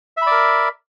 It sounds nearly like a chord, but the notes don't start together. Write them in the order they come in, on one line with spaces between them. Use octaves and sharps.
E5 B5 D5 A#4